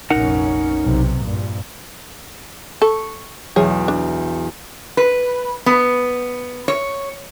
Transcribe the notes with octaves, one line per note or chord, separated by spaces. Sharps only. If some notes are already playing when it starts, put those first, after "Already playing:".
F1 A#1 C#4 D#4 A#4 F#5
B1 C3
A#1 G2 A#2
A4 C#6
B1 E2 F#3 G#4 C#5
D4
B4
B3
C#5